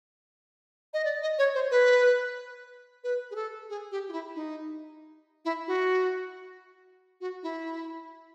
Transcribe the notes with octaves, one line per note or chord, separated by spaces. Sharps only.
D#5
D5
D#5
C#5
C5
B4
B4
G#4
A4
G#4
G4
F4
E4
D#4
E4
F#4
F#4
E4